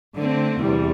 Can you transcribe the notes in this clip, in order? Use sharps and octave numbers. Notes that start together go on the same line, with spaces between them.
D3 A3 C4
E2 C3 G3